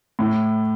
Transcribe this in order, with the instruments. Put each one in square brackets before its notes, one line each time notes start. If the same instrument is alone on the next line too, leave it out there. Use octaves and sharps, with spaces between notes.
[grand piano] A2